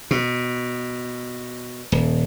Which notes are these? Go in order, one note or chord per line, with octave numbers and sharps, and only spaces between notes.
B2
D#1